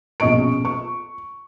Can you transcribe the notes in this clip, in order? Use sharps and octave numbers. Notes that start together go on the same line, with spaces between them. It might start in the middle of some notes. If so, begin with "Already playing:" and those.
A#1 B2 C#4 D#5 C#6 D7
C#6